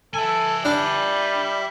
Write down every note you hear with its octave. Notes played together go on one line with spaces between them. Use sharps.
A4 E5 G#5
G3 D4